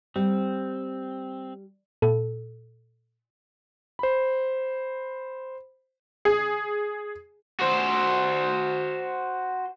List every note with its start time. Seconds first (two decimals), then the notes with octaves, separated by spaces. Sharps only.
0.16 G3 C4
2.02 A#2 A4
3.99 C5 B5
6.25 G#4
7.59 F#4 C5